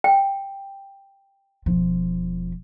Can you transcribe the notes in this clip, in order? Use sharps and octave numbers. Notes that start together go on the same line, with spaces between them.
G5
E1 F3